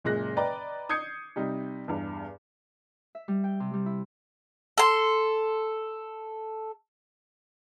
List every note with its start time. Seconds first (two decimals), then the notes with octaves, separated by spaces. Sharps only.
0.04 F#1 A#2 G#3 F#6 A#6
0.37 B4 D5 D#5 G5 A#5
0.89 D#6 G6 G#6 C7 C#7
1.36 C3 G3 D#4
1.88 E2 G2
3.15 E5
3.28 G3
3.44 G5
3.60 C3
3.73 G3
3.86 E4
4.78 A4 C6